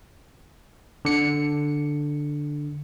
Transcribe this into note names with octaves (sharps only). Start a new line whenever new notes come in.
D3 C#7